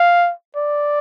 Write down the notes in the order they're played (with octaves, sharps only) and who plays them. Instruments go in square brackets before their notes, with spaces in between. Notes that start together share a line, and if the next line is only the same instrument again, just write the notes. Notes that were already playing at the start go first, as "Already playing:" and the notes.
Already playing: [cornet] F5
D5